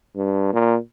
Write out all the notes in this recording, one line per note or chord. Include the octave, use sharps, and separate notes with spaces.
G2
A#2